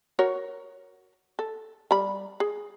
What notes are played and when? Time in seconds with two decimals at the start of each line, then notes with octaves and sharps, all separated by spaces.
0.19 F#4 A#4 C#5
1.39 A4
1.91 G3 B5
2.40 G#4